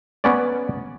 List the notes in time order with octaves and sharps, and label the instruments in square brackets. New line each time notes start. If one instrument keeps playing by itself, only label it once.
[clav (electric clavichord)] B3 C#4 D5